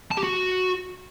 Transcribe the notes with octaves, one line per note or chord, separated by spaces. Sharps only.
A5
G4
F#4